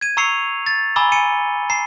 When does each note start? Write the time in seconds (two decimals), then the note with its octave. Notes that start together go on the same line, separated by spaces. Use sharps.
0.01 G#6 D#7
0.17 A#5 C#6 E6 C7 C#7 F7
0.66 A6
0.96 G#5 A#5 B5 D6 E6 G7
1.12 G#5 C#7 D#7
1.70 A#5 C7